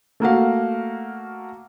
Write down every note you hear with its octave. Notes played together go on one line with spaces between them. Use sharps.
A3 A#3 F#4 F5